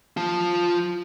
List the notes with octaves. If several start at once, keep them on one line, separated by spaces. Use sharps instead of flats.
F4 A5